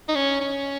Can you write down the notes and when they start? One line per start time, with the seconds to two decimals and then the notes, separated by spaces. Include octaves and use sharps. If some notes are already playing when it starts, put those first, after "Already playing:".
0.08 D#4
0.15 C#4
0.41 C#4